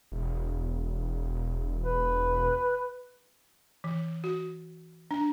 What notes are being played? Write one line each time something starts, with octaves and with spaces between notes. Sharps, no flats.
E1
B4
E3
F#4
D4